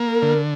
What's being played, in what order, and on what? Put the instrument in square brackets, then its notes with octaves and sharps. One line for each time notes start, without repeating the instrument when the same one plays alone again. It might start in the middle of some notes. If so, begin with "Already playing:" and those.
Already playing: [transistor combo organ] A#3
[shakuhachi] A#4
[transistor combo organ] D3